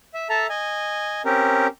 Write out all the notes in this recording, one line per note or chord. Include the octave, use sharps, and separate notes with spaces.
E5
A4 E5 A5 A#5
D#5 G#5
C4 C#4 G4 A#4